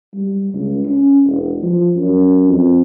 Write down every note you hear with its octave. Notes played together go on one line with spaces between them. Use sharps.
G3
C#2
C#4
E1
F3
F#2
F2